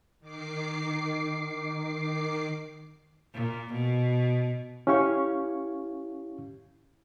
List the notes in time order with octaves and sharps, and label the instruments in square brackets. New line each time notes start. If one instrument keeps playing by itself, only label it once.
[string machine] D#3 D6 C7
[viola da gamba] A#2
B2
[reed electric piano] C#4 E4 G4 F5 C#6